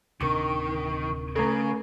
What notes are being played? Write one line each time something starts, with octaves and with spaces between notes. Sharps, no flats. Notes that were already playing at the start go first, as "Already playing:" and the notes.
D1 C3 D#3 D4 A#4 C#6 D6
C#3 A3 A4